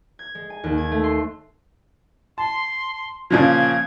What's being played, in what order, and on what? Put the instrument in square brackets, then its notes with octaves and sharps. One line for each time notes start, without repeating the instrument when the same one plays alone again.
[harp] G#6
G#3
G#5
D#2
G#6
A3
C6
[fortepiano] A5 [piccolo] C6
[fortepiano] A#2 C#3 F3 [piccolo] G#6